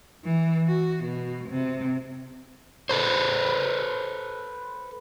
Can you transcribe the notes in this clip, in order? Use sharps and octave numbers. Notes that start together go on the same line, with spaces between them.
E3
F#4
B2
C3
A4 B4 C5